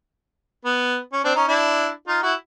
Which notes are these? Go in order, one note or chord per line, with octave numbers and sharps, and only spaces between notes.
B3
C#4
C4 D4
C#4 D#4
D4 E4
D#4 F4
E4 F#4